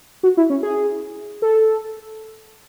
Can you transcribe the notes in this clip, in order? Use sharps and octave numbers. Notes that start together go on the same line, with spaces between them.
F#4
E4
C#4
G#4
A4